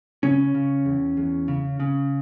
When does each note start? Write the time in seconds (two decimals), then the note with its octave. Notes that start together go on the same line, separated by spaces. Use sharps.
0.23 C#3 C#4
0.54 C#3
0.85 E2
1.17 E2
1.48 C#3
1.80 C#3